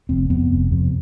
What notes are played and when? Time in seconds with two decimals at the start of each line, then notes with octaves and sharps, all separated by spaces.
0.09 F1 C4
0.30 F2 C3 B3
0.50 F1
0.71 F2 C3